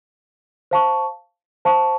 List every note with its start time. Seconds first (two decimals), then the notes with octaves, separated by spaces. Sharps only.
0.71 C5 F5 A5 C#6
1.65 C5 F5 A5 C#6